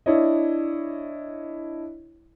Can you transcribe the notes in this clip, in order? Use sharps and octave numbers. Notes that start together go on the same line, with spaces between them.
D4 E4 C#5 D#5